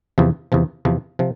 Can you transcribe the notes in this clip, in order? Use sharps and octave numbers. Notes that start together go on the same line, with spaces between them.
E2 C3 F3
E2 C3 F3
E2 C3 F3
C3 F3